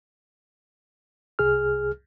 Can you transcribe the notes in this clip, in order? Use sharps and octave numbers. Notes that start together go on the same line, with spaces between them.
C2 G#4 F6